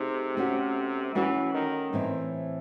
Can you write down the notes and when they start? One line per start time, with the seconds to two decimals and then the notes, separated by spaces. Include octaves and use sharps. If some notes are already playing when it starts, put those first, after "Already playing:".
Already playing: C3 A3 D#4 G#4
0.37 A3 C#4 F#4
1.15 E3 A3 C#4 F#4
1.54 D#3
1.93 A2 E3 C4